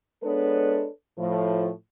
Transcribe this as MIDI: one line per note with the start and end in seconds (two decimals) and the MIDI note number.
0.23 0.88 56
0.23 0.88 59
0.23 0.88 62
0.23 0.88 69
0.23 0.88 71
0.23 0.88 73
1.19 1.69 45
1.19 1.69 53